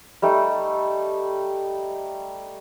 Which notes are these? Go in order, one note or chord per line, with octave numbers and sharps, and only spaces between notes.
G3 A3 D#4